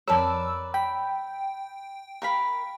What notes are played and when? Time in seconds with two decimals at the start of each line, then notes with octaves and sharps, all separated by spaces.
0.08 F2 A#4 B4 C#5 D5 A5 E6
0.74 G5 B5
2.22 A#4 F5 B5